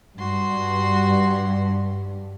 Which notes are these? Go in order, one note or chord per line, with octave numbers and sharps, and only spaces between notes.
G2 F#4 C6